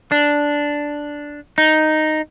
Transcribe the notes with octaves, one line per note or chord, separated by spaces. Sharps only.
D4
D#4